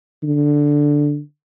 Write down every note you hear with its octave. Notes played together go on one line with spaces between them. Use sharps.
D3